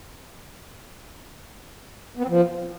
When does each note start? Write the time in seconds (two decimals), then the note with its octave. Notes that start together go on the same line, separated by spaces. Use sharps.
2.17 B3
2.23 C4
2.29 F3